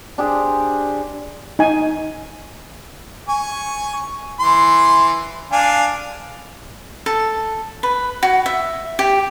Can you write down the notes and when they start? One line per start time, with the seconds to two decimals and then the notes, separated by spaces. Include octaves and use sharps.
0.18 D4 G4 G#4 C5
1.59 D#4 G#5
3.29 G#5 C#6
4.40 E3 C6
5.52 D4 F5 G#5
7.06 A4
7.83 B4
8.23 F#4
8.46 E5
8.99 G4